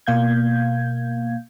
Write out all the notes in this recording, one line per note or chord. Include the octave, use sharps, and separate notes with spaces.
B2 A#3 F5 G6 G#6